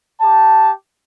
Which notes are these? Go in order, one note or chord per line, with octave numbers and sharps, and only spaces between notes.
G4 A5